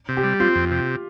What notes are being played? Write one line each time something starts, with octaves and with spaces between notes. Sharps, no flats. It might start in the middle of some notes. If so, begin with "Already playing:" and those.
C3
G4
G3
C4 F4
F2
C3